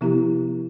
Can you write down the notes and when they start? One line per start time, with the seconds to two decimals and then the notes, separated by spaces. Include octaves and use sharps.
0.01 C3 F3 B3 E4 G4